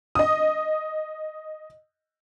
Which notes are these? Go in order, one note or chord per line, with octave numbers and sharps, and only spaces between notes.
D#5 D#6